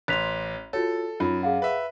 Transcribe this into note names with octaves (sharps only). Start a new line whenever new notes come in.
A1 C6 F#6 B6 F7
F4 F#4 A4 C#5
F#2 D#4 F4 B5
G#4 F5 F#5
B4 E5